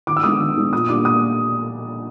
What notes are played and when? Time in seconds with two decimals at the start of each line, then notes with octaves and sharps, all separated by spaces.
0.07 D#3 D6
0.16 E6
0.23 G#3 B3 D4 D#6
0.40 D#3
0.57 G#3 B3 D4
0.73 A#2 D#6
0.89 G3 A#3 D4 D6
1.05 A#2 D#6